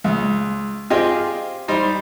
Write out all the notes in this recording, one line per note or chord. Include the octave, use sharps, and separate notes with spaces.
C#2
C4 F4 G4 G#4 D#5 G5
G3 D#4 C5